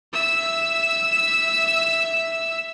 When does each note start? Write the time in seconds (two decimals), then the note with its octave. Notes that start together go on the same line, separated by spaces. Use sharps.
0.13 E5 E6